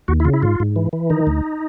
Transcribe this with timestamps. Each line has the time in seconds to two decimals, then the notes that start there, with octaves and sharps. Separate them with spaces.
0.08 D#2 F#4
0.20 E4
0.25 C#3 F4
0.33 E4
0.42 G#2 F4
0.60 G#2
0.76 E3
0.93 E3
1.10 D#3 D#4
1.27 D2